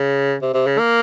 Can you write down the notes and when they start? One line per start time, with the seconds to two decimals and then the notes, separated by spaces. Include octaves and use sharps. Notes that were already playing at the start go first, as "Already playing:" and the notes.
Already playing: C#3
0.42 C3
0.54 C3
0.67 C#3
0.79 A#3